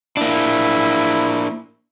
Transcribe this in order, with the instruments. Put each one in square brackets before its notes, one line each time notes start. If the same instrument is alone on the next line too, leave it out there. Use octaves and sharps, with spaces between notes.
[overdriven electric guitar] A#3 D4 [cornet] E4